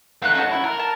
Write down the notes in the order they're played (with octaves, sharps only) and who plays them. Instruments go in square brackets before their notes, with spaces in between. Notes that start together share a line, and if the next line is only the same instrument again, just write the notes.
[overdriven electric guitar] A3 D#4 [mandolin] F5 F#5 F#6
[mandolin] C#4 F#4 A5
[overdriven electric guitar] E4
A#4
[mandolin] A5